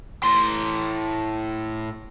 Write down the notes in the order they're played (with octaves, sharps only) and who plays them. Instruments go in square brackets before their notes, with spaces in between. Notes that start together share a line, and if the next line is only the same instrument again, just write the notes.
[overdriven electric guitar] A2 C6